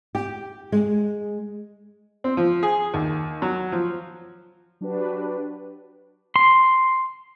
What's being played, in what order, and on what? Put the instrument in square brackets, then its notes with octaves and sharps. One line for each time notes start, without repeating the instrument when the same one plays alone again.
[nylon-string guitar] G4
G#3
[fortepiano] C4
F3
G#4
D#2
F#3
F3
[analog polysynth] F#3 D4 F#4 G4 B4
[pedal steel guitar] C6